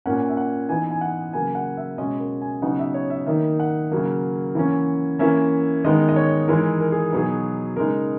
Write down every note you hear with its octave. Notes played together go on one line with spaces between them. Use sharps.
A#2 A#3 C#4 F#5
E5
F#5
E3 B3 D#4 G#5
G#5
F#5
C#3 F#3 A#3 G#5
F#5
E5
B2 G#3 C#4 D#5
A#4
G#5
C#3 F#3 B3 D#4 F#5
E5
C#5
E5
D#3 A#3 D#4 E5
F#5
C#3 F#3 A#3
E3 A#3 C#4
E3 A#3 C#4 E5
D#3 G#3 B3 D#4 D#5
D#5
C#5
E3 G#3 D#4 A#4
A#4
G#4
B2 F#3 B3 D#4 G#4
C#3 G#3 D#4 A#4